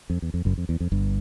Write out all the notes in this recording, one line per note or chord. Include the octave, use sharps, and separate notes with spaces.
F2
E2
F2
F#1 F#2
F2
E2
F2
G1 G2